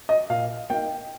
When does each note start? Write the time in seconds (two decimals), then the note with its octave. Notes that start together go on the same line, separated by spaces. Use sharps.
0.09 D#5
0.30 A#2 F5
0.70 A#3 D#4 G5